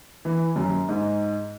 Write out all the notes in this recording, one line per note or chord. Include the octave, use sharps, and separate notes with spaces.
E3
F#2
G#2